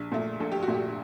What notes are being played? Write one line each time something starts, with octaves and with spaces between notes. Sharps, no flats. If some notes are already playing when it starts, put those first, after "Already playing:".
Already playing: A#1
A#2 A3
A#1 A4
G4
F#4
A#2 A3
G4